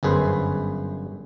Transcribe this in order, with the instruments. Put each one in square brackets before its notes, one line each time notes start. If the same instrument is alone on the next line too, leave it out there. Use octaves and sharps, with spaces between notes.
[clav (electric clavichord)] G1 F#2 G#4 B4 C5